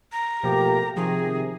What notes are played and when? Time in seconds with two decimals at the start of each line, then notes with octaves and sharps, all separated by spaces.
0.12 A#5
0.43 B2 F3 A3 A#3 G4
0.96 C3 D#3 F3 G#4